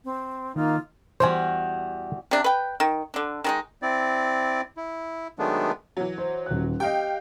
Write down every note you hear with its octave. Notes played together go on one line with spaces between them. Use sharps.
C4
D#3 A#3 D#4 F4
E2 G3 F#4 C5 G#5
C3 D4
B4 G5
D#3
D3 D4
D#3 G#3 D#4
C4 E4 D5
E4
D#3 F#3 G#3 A3 B3 D4
E3 F#3
C5
D#1 F#6
G4 D#5 F5 G5